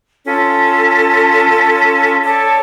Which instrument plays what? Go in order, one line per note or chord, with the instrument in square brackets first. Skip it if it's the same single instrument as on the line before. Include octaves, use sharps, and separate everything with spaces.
[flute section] C#4 F4 A4
A4 C#5 D5 A5